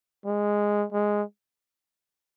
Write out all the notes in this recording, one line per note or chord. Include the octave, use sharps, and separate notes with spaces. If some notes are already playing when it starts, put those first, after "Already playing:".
G#3
G#3